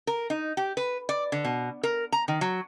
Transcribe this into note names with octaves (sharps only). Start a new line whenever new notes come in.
A#4
D#4
G4
B4
D5
D3
B2
A#4
A#5
D#3
F#3